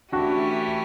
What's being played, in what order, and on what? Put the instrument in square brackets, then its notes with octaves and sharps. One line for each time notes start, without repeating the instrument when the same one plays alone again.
[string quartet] E3 A3 C#4 E4 G4 [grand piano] D4 F#4